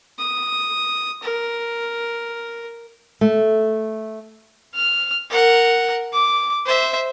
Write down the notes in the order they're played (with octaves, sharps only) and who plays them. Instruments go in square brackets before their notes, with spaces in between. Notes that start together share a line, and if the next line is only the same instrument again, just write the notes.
[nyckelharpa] D#6
A#4
[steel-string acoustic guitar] A3
[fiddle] F6
A#4 F#5
D6
C5 E5